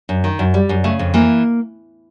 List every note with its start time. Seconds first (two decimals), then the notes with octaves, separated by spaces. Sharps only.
0.09 F#2
0.24 D#3
0.39 F#2
0.54 G3
0.69 F#2
0.84 C#3 A3
0.99 F2
1.14 E3 A#3